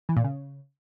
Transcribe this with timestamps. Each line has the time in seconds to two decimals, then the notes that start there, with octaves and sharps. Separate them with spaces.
0.09 E3
0.17 A#2
0.24 C#3